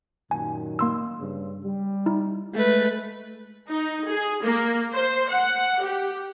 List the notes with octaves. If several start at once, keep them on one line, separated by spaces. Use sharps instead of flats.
F#2 A#2 D#3 G#5
A#3 C6 E6
G2 C#3
G3
D#4 E4
G#3 A3 B4
D#4
G#4
A#3
C5
F#5
G4